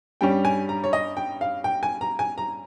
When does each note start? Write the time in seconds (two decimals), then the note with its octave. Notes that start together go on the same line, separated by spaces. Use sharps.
0.21 G2 G3 C#4 G5
0.45 G#5
0.69 A#5
0.84 C#5
0.93 D#5
1.17 G5
1.41 F5
1.64 G5
1.83 G#5
2.01 A#5
2.19 G#5
2.38 A#5